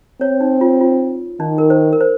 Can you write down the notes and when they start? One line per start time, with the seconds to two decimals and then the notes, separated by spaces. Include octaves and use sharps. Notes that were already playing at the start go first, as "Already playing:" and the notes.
0.21 C4 C#5
0.41 D#4
0.61 F4
0.81 F4
1.40 D#3 D#4
1.58 A#4
1.70 C5
1.93 A#4
2.01 C5